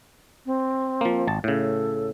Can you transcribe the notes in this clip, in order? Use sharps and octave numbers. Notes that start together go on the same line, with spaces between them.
C4
F3 A#3
G#1 A5
A2 C#3 A4